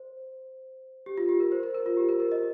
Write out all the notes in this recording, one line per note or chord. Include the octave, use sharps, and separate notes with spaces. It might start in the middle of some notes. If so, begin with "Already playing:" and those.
Already playing: C5
G4
F4
G4
A#4
C5
A#4
A#4
F4
G4
A#4
A#4
D#5